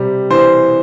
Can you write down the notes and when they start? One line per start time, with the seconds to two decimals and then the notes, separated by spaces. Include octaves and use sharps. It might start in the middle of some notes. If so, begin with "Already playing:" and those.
Already playing: C3 G3
0.30 E3 C5